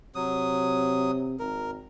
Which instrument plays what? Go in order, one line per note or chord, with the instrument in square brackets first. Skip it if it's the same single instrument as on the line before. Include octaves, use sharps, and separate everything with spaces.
[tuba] C3 [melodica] F#3 D#6
[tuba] G#1 [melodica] A#4